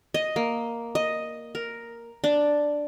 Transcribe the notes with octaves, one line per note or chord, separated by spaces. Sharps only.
D#5
A#3
D#5
A#4
D4